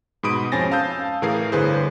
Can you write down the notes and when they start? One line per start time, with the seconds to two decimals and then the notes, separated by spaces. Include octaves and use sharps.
0.23 G#2 B2 B5 D#6 D7
0.52 F2 C#4 C5 G#5 A6 A#6
0.71 F5 A5 D#6 E6 G6
1.22 A2 E3 G#4 A#4 F5 C7
1.52 G1 G#4 B4 C5